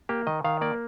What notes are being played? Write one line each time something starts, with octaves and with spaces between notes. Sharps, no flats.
A#3 G4
D#3 D#5
D#3 F5
A#3 D5